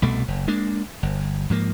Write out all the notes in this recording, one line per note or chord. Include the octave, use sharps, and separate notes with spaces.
C2 B2 A3
F#1
G#3 A#3 D4
G1
G#2 F3 A#3